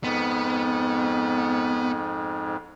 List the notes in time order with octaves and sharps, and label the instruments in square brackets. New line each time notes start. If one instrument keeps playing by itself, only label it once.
[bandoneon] F2 G#2 [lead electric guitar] B3